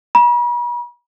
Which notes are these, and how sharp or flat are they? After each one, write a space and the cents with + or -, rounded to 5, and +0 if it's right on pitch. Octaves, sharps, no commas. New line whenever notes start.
B5 -45